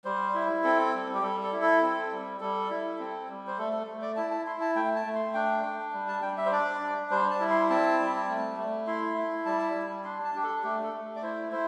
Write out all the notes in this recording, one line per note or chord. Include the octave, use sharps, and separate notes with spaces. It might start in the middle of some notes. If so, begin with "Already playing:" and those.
G3 C5
E4
C4 A4
G3
G4
G3 A4
A4
E4
A4
C4
G3
G3 A4
E4
C4
G3
C5
A3 A4
A4
A3
D5
E4 A5
A5
E4 C6
A5
A3 G5
A5
A3
C6
D4 G5
D4
G3
A5
G3 G5
E5
C5
D4 D5
D4
G3 C5
A5
E4
C6
C4 A5
G3
A3
A3
E4 C6
E4
G3 A5
G3
D4 C6
A5
D4 G4
A4
A3 G4
A4
A3
D5
E4 C5
E4 C5